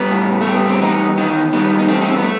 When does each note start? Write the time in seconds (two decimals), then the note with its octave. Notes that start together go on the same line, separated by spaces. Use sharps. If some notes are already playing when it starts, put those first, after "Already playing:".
Already playing: G3 B3
0.11 A2
0.41 A3
0.46 G3
0.55 B3
0.68 C4
0.81 E2 B3 D#4
1.17 D#3 B3 D#4
1.53 G3 B3 D#4
1.79 D#4
1.88 E2 A3 C4
2.01 D#4
2.09 C4
2.17 B3
2.24 A3